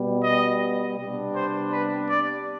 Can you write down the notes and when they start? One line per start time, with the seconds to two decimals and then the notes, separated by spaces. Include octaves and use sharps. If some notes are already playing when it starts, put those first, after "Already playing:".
Already playing: B2 G3 B3
0.23 D#5
0.98 C3 G3 B3 D4
1.36 C5
1.73 B4
2.10 D5